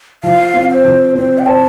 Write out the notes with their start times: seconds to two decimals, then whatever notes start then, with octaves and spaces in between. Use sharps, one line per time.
0.23 F3 F5
0.54 C4
0.70 C5
0.85 F3
1.15 C4 C5
1.38 G5
1.46 C5 A5